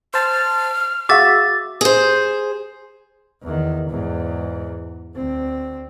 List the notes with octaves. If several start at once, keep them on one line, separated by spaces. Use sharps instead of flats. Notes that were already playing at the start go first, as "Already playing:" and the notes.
C5 A5 F6
F#4 G#4 E5 F5 D6 A6
G#4 C5
E2 D#3
E2 G#2
D2 C4